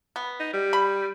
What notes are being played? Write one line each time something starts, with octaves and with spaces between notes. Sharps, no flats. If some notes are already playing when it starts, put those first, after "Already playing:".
B3
D#4
G3
B5